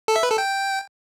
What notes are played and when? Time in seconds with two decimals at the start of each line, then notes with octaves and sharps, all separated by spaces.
0.08 A4
0.16 E5
0.23 B4
0.31 A4
0.38 G5